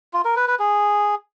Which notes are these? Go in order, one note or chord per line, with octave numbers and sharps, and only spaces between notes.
F4
A#4
B4
B4
G#4